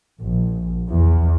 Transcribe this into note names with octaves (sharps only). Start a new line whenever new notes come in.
A#1
E2